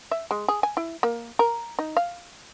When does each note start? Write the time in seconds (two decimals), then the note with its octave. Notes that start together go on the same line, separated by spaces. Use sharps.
0.11 E5
0.31 G#3
0.48 G#4
0.63 G#5
0.77 E4
1.03 A#3
1.39 A#4
1.79 D#4
1.97 F5